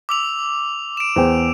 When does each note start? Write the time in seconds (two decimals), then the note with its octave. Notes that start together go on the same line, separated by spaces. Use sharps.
0.09 D6 E6 F7
0.97 D7 E7
1.16 E2 C5 G5